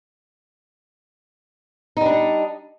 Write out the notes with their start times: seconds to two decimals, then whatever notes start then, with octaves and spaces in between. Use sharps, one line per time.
1.97 D#4
2.01 G3
2.06 D4